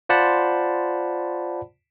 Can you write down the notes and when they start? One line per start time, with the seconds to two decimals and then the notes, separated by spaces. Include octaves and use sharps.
0.09 F4 C5 D5 F#5 A5 B5